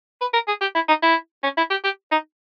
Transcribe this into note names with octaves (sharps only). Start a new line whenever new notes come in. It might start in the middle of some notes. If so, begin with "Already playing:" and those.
B4
A#4
G#4
G4
E4
D#4
E4
C#4
E4
G4
G4
D#4